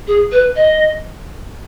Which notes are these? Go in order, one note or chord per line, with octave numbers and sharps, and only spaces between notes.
G#4
B4
D#5